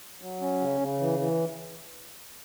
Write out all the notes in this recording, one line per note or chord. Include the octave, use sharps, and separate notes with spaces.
F#3
C#4
C#3
C#3
E3
E3